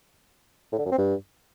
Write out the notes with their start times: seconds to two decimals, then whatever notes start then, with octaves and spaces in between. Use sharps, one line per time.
0.72 A2
0.79 D3
0.85 F#2
0.92 C4
0.98 G2